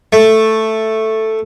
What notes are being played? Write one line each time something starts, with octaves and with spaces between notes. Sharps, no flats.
A3